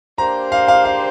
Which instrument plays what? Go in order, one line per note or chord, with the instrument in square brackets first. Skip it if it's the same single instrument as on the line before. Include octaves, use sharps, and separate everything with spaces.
[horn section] A#3 D4 G4 C5 [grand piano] A#5
[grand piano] F5
F5
F5